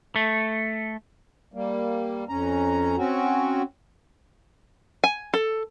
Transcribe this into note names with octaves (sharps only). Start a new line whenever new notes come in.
A3
G3 A#3
F2 C#4 A#5
C4 C#4 F#4
G#5
A4